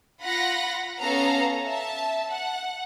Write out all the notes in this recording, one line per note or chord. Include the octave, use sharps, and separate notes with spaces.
F4 F#5 B5 A#6
B3 C#4 A4 F5 A#5
E5 A5
F#5